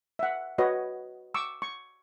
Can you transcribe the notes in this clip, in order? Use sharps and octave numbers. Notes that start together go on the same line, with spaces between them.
E5 F#5
F#4 B4 C#5 D#5
C#6 D6 E6
C#6